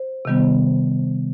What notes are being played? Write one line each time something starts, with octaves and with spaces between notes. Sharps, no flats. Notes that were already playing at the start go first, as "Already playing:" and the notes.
Already playing: C5
C3 D#3 G3 B3